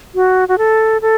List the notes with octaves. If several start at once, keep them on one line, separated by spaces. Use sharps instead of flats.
F#4
F#4
A4
A4